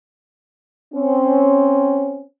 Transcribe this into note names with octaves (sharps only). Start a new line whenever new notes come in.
C4 C#4